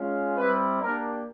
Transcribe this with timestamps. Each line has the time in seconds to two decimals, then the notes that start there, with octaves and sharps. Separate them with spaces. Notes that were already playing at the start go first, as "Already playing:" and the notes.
Already playing: G#3 C#4 F4
0.36 G3 C4 E4 B4
0.80 A#3 D4 G4 A#4